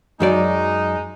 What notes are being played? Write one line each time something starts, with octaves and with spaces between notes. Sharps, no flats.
F#2 F#3 G#3 D#4 D5